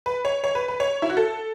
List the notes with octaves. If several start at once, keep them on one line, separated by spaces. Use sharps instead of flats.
B4
C#5
C#5
B4
B4
C#5
E4
F#4
A4